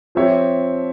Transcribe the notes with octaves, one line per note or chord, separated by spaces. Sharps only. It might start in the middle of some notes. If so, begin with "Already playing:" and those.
F3 C4 G4 C#5 E5